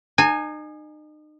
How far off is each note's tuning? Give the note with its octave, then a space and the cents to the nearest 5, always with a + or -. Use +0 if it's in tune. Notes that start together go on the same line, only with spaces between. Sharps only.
D#4 -35 G#5 +0